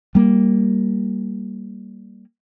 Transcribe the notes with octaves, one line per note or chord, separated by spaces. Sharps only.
G3 A#3